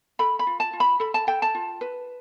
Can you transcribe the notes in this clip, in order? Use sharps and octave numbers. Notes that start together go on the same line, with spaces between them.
A4 B5
B5
F4
A5
F4
B5
A4 B5
A5
A4 G5
A5
F4
B4